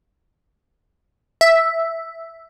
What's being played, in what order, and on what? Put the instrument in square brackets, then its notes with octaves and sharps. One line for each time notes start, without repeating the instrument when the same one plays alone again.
[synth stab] E5